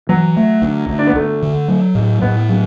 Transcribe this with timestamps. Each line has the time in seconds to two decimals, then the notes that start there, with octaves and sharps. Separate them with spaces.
0.09 E3 F#3
0.36 A3
0.62 D2
0.89 D2
0.99 D4
1.07 B3
1.15 D2 A3
1.43 D3
1.68 F#3
1.95 A2
2.22 A2 B3
2.49 F#3